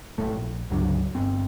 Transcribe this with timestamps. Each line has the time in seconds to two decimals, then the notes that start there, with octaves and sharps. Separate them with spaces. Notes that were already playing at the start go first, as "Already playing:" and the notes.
0.18 G#1 A2 A3
0.33 A#1
0.70 C#2 G2 D3 F#3
1.15 G1 C4